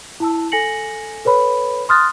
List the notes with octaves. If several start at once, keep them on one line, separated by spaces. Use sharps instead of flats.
E4 A5 E6
A4 G#5 A#6 C#7 F#7
A4 B4 C#5 B5
C6 D#6 F6 F#6 A6